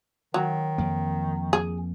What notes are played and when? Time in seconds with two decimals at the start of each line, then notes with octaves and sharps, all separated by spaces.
0.34 D#3 F#3
0.78 F2 A#3
1.53 G#4